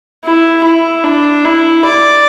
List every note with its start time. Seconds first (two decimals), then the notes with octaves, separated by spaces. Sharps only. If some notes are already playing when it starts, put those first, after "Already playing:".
0.24 E4
0.64 E4
1.04 D4
1.45 E4
1.85 D5